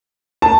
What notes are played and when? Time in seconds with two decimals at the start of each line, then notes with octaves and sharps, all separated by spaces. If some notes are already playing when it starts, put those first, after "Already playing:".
0.42 A5